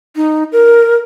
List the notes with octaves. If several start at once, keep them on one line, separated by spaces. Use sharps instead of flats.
D#4
A#4